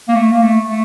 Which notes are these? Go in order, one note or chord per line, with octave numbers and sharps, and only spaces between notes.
A#3
A3
A#3
A3
A3